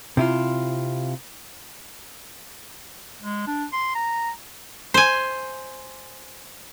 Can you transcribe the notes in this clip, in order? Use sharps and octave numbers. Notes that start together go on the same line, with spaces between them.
C3 E4 F4
G#3
D4
C6
A#5
C5 G#5